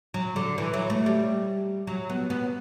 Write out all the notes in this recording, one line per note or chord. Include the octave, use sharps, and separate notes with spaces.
F#3
D3
E3
F#3
A3
G3
F#3
B3
B3